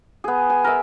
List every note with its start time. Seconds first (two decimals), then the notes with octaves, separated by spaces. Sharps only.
0.24 B3 G#4
0.50 G#5
0.64 A#4 E5